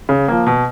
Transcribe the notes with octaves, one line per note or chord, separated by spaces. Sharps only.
C#3
F3 A#3
B2